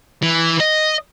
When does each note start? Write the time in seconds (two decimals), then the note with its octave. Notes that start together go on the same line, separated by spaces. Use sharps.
0.23 E3
0.60 D#5